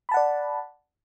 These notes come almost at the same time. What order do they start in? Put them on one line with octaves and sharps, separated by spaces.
B5 A5 F#5 D5